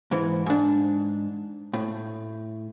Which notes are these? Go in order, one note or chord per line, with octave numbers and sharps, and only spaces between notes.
G#2 E3
G#2 D4
A2